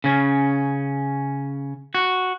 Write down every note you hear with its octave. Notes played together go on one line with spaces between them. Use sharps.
C#3 C#4
F#4